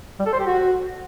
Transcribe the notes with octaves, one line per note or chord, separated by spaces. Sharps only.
G3
A4
C5
G4
F#4